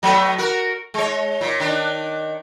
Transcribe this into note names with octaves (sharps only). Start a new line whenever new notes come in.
F#3 A3 B3
F#4 A#4
G#3 C#5
A#2
D#3 D4